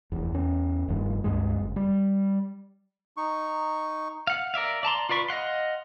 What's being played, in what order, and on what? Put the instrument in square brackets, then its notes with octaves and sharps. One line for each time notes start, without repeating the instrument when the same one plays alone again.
[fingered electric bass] F1 E2
E2 C#4
F1 G2 D#3
C#2 G2 G#3
F#1
G3
[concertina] D#4 C#6
[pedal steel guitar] F5 F#5
A#4 D5 E5 F5
D5 A5 A#5 C6
F4 B4 D5 B5 C#6
D#5 F5 F#5 C6